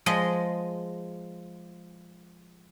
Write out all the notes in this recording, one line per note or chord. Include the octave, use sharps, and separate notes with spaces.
F3 G#3 G#4 D#5